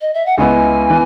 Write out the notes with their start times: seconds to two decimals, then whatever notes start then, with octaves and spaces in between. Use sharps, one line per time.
0.01 D#5
0.14 E5
0.26 F#5
0.37 C#2 C#3 G#3 B3 E4 G#5
0.90 E3 B3